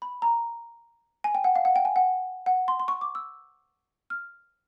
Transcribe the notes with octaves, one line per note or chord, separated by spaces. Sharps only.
B5
A#5
G#5
G5
F#5
F5
F#5
G5
G#5
F#5
F#5
C6
C6
C#6
D6
E6
F6